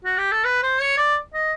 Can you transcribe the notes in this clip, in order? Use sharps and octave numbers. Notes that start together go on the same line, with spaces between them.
F#4
G4
A4
B4
C5
C#5
D5
D#5